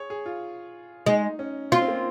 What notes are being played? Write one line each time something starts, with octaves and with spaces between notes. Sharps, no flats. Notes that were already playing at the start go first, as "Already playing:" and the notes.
Already playing: G#4 C#5
G#4
F4
G#3 D#4
C#4
C4 F4
C4
A#3